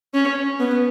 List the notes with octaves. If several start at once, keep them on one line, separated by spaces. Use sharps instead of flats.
C#4
B3